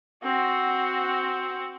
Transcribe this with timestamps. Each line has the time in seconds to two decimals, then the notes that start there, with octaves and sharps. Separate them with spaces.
0.23 C4 F#4